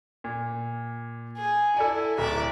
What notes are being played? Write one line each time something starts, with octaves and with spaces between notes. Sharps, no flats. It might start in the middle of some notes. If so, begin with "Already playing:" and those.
A#2
G#4
E4 A4 D5 G#5
D1 D5 E5 A#5